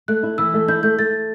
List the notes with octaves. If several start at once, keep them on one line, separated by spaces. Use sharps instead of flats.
A3 F#6
E4
E3 E6
A3
E4 G6
A3 G6
A3 A6